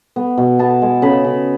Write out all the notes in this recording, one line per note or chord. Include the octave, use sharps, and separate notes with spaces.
B3
B2
B3 A5
G#3
C#3 B5
C#3